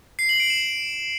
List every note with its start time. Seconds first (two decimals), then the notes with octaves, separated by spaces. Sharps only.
0.19 C7
0.29 F#7
0.40 D7
0.50 E7